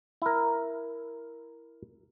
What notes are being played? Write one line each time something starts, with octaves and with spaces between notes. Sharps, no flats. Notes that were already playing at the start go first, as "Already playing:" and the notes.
E4 A#4